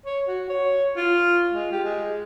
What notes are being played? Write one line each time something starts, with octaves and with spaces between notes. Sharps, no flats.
C#5
F#4
C#5
F4
G#3
G4
G#3